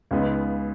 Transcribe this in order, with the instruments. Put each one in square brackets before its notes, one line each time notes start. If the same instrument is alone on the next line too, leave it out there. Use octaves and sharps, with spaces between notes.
[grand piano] C#2 C#3 G#3 B3 D#4